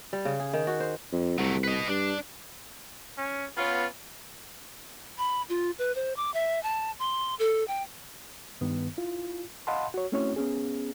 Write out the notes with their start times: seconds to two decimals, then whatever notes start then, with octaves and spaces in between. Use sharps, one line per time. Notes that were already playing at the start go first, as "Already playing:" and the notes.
0.13 G3
0.25 C#3
0.40 G#4
0.53 D#3
0.67 F#4
0.80 C5
1.12 F2
1.39 C2 F#3 A3
1.64 B4 D#5
1.88 G2 D4
3.17 C#4
3.57 B3 C#4 F4
5.18 B5
5.49 F4
5.79 B4
5.95 C5
6.17 D6
6.34 E5
6.63 A5
6.99 C6
7.39 A4
7.68 G5
8.61 G2 D#3 B3
8.98 E4 F4
9.67 D#5 F5 F#5 A5 B5 C6
9.94 F#4 C#5
10.12 A3 C4 C#4 E4 F#4 C#5
10.36 B3 C#4 G#4